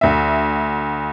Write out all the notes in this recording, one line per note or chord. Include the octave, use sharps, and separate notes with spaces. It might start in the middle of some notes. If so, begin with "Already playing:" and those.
D2 E5